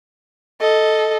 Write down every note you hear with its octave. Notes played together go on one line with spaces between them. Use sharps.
A4 D#5